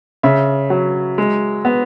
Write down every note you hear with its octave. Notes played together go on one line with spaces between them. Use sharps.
C#3 E5
F#3
G#3
B3